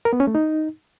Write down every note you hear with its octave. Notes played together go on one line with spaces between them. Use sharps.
A#4
B3
C#4
A3
D#4